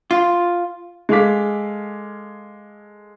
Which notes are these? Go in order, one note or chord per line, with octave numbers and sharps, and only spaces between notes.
F4
G#3 G#4 A4 F5 D6 B6